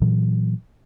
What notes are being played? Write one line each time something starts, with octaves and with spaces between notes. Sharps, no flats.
A#2 E3 F#3